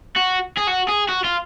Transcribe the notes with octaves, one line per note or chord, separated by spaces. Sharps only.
F#4
G#4
F#4
G#4
F#4
F4